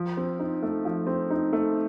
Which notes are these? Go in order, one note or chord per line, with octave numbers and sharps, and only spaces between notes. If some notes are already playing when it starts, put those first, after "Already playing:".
Already playing: F3
C4
D#4
A3
F3
C4
D#4
A3